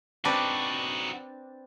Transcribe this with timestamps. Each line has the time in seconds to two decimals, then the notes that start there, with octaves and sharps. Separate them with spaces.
0.25 C4 D4 D#4 F#4 B4